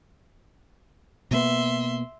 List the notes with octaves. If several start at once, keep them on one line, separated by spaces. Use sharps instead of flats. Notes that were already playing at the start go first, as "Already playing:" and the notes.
B2 A#3 B3 E5 C6